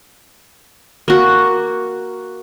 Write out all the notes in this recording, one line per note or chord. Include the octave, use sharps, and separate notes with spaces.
A#3 F#4